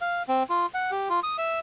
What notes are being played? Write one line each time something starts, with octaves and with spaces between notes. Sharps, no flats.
F5
C4
F4
F#5
G4
F4
D#6
E5